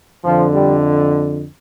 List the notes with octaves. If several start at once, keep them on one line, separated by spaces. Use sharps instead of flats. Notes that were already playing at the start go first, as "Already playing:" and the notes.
F2 D3 F3
G3